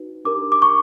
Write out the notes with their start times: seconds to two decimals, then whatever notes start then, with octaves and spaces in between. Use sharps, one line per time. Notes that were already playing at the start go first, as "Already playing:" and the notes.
Already playing: D#4 F#4 B4
0.25 D4 G4 A#4 D6
0.52 D6
0.62 C#6